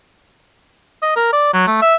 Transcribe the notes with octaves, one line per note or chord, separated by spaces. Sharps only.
D#5
A#4
D5
F#3
A3
E5